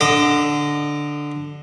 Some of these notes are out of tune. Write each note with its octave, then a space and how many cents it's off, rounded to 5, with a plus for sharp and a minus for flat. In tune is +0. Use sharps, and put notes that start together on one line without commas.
D3 +0 D#5 +0 D6 +40